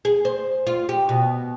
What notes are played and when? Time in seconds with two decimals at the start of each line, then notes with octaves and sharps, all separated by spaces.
0.05 G#4
0.25 C5
0.67 F4
0.89 G4
1.09 B2